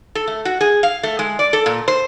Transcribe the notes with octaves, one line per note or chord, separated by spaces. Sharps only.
A4
A3
F#4
G#4
F5
A3
G#3
D5
A4
A#2
C5